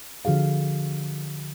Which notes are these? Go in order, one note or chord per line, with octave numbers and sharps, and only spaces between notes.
D3 F3 F#4 G#4 F5